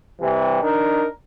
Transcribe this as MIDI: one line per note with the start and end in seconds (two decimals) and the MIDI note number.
0.22 0.62 48
0.22 0.62 52
0.22 0.62 55
0.63 1.06 62
0.63 1.06 63
0.63 1.06 70